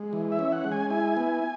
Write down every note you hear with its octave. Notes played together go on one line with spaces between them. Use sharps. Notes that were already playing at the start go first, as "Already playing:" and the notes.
Already playing: G#3
E3
E5
C#4
F#5
G#3
G#5
E4 G#5
B3